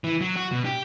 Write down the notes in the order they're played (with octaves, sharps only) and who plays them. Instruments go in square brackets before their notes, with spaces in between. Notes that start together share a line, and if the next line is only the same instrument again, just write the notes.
[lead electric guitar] E3
F#3
F#4
B2
G4